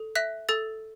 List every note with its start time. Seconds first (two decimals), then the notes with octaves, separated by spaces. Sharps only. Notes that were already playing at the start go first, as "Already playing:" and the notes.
Already playing: A4
0.15 E5 F#6 B6
0.49 A4 E6 A6